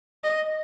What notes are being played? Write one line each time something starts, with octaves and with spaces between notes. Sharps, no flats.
D#5